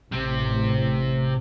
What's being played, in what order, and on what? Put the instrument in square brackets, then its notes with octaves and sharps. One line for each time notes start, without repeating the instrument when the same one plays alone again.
[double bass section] A1 [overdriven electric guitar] C3